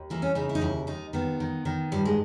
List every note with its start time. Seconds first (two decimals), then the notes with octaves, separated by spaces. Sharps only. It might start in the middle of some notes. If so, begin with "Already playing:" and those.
Already playing: D#2
0.10 E3 A#3
0.22 C#4
0.35 C#3 D#4
0.49 E4
0.55 D#4
0.61 D#2 E4
0.87 D#2 D#4
1.13 D#3 B3
1.40 D#3
1.65 D#3
1.92 G2 G3
2.05 G#3